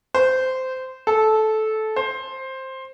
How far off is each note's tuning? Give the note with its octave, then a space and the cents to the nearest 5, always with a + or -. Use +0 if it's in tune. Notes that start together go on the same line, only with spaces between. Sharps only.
C5 -15
A4 -15
C5 +10